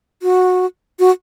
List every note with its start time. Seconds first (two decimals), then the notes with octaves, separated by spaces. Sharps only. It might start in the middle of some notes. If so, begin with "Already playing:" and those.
0.22 F#4
0.99 F#4